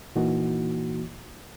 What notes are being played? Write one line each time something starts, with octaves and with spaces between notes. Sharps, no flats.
A#2 E3 A#3 D#4 F#4